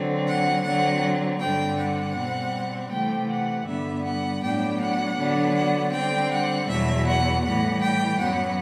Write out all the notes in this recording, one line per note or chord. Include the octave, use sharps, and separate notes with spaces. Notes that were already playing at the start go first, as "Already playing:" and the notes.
Already playing: D3 F#3 C4
F#5
D3 F#3 C4 F#5
G2 D3 G3 C4 G5
F#5
B2 G3 C4
C3 E3 A3 G5
F#5
G2 D3 G3 B3 E5
F#5
A2 F#3 B3 D4 G5
F#5
D3 F#3 B3 D4
F#5
D3 G3 C4 G5
F#5
E2 B2 F#3 E5
F#5
A2 E3 G3 F#5
G5
F#2 F#3 B3 F#5